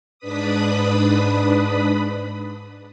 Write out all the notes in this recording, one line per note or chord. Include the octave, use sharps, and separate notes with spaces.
G#2 D4 B4 B5 D#6